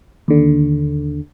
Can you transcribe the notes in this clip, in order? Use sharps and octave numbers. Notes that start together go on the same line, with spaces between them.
D#2 D3